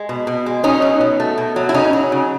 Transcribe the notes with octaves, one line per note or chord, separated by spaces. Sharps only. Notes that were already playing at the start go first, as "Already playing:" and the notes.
Already playing: G#3
B2
B2
G#3
B2 C#4 D#4
F#3
B2
A3
B2
F#3
E4
C#3 C#4 D#4
F#3
C#3